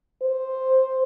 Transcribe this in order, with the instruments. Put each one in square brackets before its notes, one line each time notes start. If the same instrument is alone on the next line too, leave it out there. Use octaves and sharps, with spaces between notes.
[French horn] C5